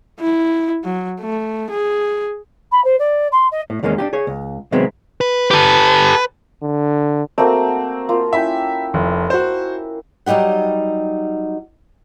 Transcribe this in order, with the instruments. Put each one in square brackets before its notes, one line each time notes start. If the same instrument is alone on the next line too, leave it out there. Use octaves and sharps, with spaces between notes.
[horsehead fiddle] E4
F#3
A3
G#4
[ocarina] B5
C5
D5
C6
D#5
[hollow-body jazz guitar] A2
E2 D#3 G#3 A#3 C#4
D4 F4 G4
G#4 C#5
C#2
C3 D#3 F#3 G#3 B3 C4
[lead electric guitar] B4
[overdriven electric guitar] G4 A4 [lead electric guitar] B4
[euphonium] D3
[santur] A3 A#3 F#4 [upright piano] C4
[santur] A#3 F4
[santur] C#4 E4 G5 [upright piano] E5
[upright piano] F1
F#4 C5
[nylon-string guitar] F#3 G3 D#4 G4 F#5